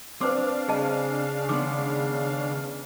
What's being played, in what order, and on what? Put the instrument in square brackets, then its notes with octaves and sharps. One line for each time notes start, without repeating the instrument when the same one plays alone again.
[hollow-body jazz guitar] C4 [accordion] D4 F5 [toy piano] B4 C5 D6
[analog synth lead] C#3 [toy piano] G#4 D#5 A5
[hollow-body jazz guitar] D#3 G#3 B3 [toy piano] D6